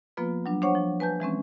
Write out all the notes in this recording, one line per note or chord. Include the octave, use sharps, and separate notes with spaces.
F3 A#3 B3 F4 B4
F#3 G3 D4
D4 C5 C#5 F#5 C#6
F3
B4 G#5 A5 G6
E3 G#3 C4 C#4